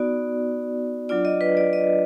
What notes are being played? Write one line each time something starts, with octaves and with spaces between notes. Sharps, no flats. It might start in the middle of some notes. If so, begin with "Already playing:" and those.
Already playing: B3 D#4 F#4 D5
F#3 D4 F4 D5
D#5
B4
D5
D#5